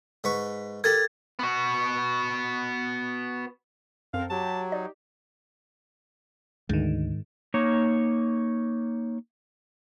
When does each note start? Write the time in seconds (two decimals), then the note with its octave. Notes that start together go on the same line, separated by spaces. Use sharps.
0.24 G#2 B4 C#6
0.84 G4 A4 A#4 G#6 A6
1.39 B3 F#4
4.14 F#2 C4 A4 A#4 F5
4.30 F#3 G4 A5
4.72 D#4 D5
6.69 D2 G#2 D#3
7.54 A#3 D#4 C#5